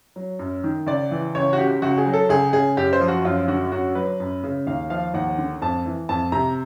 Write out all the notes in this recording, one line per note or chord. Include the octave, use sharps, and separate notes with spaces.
F#3
F#2
D#3
C#2 D5
E3
C#2 C#5
F#4
C#3 G4
C#2 F#4
G#4
F#3
A4
C#2 G#4
C#3 G#4
F#2 G4
C5
F3
F#4
F#2 F4
D3 F#4
F#2 F#4
F#3 B4
F#2
C#3
D#2 F5
F3 F5
D#2 F#5
D3
F2 A5
E3
F2 A5
C3 A#5